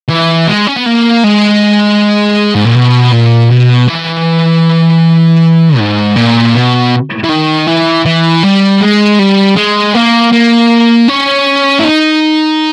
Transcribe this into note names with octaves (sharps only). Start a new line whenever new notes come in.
E3
G#3
C#4
B3
A#3
G#3
G#2
A#2
B2
A#2
B2
E3
G#2
A#2
B2
E3
D#3
E3
E3
G3
G#3
G3
G#3
A#3
A#3
C#4
E4
D#4